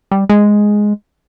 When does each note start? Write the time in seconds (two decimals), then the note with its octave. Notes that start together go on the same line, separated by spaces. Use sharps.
0.11 G3
0.30 G#3